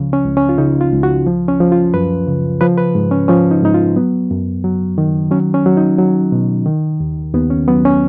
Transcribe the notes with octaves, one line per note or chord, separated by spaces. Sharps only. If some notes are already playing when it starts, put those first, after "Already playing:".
Already playing: C#2 C#3 F3
C#4
C#2
C#4
F4
C#3 D#4
F4
C#2
F#4
F3
C#4
F3
F4
F#2 B4
C#3
F3 B4
B4
G#2
C#4
F3 C#4
D#4
G#2 D#4
F4
F#3 B3
F#2
F#3
D#3
F#3 C#4
C#4
F#3
D#4
F#3
B2
D#3
D#2
D#2 B3
C#4
F#3 B3
C#4